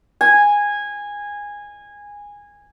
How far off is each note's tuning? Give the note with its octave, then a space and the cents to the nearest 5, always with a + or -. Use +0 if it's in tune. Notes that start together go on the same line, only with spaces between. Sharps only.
G#5 -15